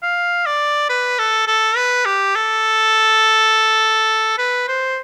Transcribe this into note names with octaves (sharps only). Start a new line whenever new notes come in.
F5
D5
B4
A4
A4
B4
G4
A4
B4
C5